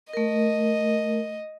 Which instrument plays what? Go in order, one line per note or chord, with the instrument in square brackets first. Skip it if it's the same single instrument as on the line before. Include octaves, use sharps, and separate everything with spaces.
[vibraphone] A3 A#4 [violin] D#5